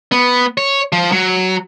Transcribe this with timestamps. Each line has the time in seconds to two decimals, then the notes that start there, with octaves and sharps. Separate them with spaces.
0.12 B3
0.57 C#5
0.92 F3
1.12 F#3